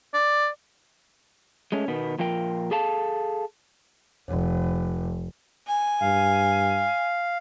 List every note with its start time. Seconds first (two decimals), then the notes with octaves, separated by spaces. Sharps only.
0.14 D5
1.72 G#3 A3 C#4
1.88 B2 D#3 B3
2.19 A#2 F3 F4 A#4 G5
2.71 G#4 A4 F5 A5
4.28 F1
5.67 G#5
6.01 G2 F5